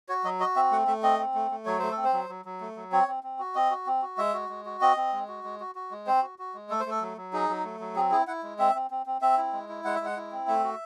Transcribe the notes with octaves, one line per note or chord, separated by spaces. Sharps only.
F#4 C#5
F#3 D#5
F#4 D#5
C4 E5
A3 F#5
A3 E5
C4 D#5
C4
A3
A3
F#3 C#5
A3 C5
A4
C4
C5
F#3
F#3
F#3
A3
F#3
C4 C#5
C4
C4
F#4
C4 D#5
F#4
C4
F#4
G#3 E5
F#4
G#3
F#4
C4 D#5
C4
G#3
F#4
G#3
F#4
F#4
G#3
C4 C5
F#4
F#4
G#3
A3 A4
C5
A3 A4
F#3
F#3
D#4 G#4
F#3
A3
F#3
C4 G#4
E4 G#4
E4 F#5
G#3
C4 E5
C4
C4
C4
C4 E5
E4
G#3
E4
G#3 F#5
E5
G#3 F#5
E4
C4
A3 E5
F#4